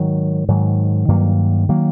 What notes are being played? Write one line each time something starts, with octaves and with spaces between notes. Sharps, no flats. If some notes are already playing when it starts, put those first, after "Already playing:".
Already playing: G#2 D#3 F#3
G#2 D#3 F#3
G2 D#3 F#3 A#3
D#3 F#3 A#3